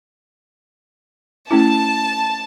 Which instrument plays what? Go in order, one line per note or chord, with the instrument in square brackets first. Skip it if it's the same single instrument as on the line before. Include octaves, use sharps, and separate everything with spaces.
[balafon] A3 C#4 E4 [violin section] A5